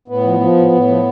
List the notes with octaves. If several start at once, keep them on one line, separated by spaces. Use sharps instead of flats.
A2 B3
F3
F3
A2
A2
F3